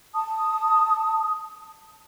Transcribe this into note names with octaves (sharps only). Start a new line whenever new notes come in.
A5 D#6